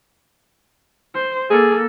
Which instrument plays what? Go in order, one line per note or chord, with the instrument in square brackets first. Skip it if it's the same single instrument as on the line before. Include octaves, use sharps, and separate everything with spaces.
[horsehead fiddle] C5
[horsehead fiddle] A#3 A4 [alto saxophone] G#4